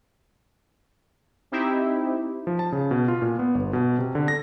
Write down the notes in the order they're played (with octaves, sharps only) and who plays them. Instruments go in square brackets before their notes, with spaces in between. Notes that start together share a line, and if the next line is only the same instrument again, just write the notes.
[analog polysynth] C4 D#4 E4 G4
[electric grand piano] F3
A5
C#3
B2
F4
A#2
B3
G1
B2
C3
D3
A#6